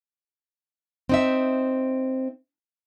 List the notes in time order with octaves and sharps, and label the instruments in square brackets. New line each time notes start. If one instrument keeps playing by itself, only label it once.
[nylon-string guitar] C4 D#4 E5